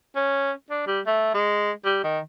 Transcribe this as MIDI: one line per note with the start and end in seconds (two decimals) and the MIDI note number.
0.16 0.51 61
0.70 0.82 62
0.87 1.00 55
1.06 1.32 57
1.34 1.71 56
1.85 1.99 55
2.03 2.19 51